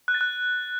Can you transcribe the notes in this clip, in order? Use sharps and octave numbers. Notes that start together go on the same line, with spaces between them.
F#6
A6
F#6